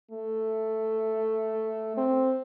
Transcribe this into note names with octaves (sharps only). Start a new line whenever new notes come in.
A3
C4